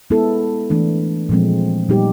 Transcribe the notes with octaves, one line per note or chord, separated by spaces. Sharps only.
G#3 B3 E4 A4
E3 A3 D4
A#2 F3 G#3 C4
A#2 G3 B3 D#4 G4